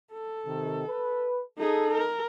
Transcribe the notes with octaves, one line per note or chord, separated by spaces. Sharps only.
A4
C3 D#3
B4
D#4 G#4 A4
A#4